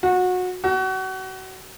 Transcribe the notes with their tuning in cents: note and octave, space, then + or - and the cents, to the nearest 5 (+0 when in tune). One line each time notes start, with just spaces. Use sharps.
F#4 -25
F#4 +30